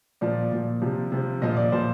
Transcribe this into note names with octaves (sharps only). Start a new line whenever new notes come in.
A#2 F3 D5
A#2 F3
C3 F3
C3 F3
A#2 F3 D#5
D5
A#2 F3 C5